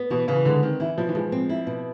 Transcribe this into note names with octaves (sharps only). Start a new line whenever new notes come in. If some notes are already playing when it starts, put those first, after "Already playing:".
Already playing: B3
B2 E3
C#3 E3
D3 G#3
D#3 C4
E3 E4
B2 F3
E3
F3 G#3
C4
E4
B2